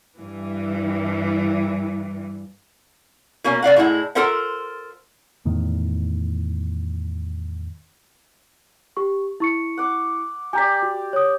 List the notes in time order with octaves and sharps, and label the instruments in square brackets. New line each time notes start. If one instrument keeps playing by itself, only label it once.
[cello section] G2 E3
[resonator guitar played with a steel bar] B2 A#3 C#4
C#3 D5 F5 F#5
A2 G#3 E4 F#5
F4 A4 A#4 C5 E5 F#5
[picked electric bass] E2 A2 D#3
[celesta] G4 C#6
E4 C#6 C#7
[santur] F#5 D6
[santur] G4 D5 [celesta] G#5 A#5 B6
[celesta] F#4
C#5 D#6